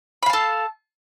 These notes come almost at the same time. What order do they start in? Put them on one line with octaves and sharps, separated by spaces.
B5 F5 A5 A4